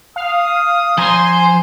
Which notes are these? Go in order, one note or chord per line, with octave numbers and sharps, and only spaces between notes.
F5 D#6
F3 C5 G#5 A#5 C6